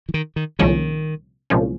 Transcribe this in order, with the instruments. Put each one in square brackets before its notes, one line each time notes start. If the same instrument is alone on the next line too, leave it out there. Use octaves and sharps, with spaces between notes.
[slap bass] E3
D#3
D#3
[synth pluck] C2 A#2 F3 G#3 C#4 [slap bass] D#3
[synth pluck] C2 A#2 F3 G#3 C#4